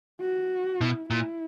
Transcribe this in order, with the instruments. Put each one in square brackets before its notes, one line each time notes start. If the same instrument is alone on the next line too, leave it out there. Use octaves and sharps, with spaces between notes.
[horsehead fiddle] F#4
[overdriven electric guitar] B2 [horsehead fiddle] E4
[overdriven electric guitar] A#2 [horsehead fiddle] E4